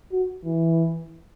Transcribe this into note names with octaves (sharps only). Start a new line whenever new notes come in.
F#4
E3